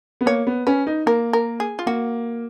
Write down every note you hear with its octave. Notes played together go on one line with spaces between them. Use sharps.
B3
A#3 C#5
B3
C#4 B4
D#4
A#3 A#4
A#4
G#4
F4
A#3 F#4